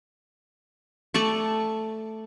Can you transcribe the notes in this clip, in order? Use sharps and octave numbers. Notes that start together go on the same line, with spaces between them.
A3 D5 A5 C#6